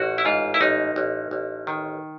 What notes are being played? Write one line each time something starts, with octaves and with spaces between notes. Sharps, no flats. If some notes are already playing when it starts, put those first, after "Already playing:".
Already playing: A1 F#4
E4
G#2 F4
E4
A1 D#4
A1
A1
D#3